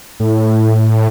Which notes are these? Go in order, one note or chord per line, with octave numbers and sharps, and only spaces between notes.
A2